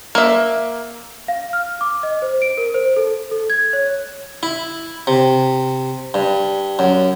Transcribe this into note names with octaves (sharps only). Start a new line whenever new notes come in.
A#3 E5
F5
F6
D6
D#5
C5
D7
A#4
C5
A4
A4
G#6
C#5
E4
C3
G2
F#2